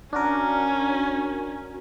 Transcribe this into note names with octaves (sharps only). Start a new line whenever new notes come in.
C#4 D4 F#4 A#4